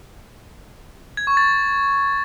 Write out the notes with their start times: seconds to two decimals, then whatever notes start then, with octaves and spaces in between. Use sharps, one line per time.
1.17 G#6
1.27 C#6
1.37 A6